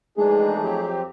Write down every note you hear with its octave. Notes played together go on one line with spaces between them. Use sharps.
F2 E3 G#3 A3 D4 D#4 G#4
F2 F#3 C4 G4